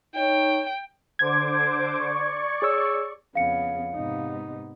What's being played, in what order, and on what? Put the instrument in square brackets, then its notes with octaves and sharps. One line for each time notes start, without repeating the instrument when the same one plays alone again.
[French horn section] D#4 C#5 [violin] G5
[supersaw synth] D3 C5 D6 [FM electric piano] G#6
[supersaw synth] D5 C#6
[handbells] G#4 C#5 E6
[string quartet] F2 C#3 B3 [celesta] F5 C#7
[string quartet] G#2 B3 [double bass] C3 D#4